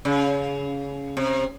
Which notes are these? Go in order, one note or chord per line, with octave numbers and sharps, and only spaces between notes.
C#3
C3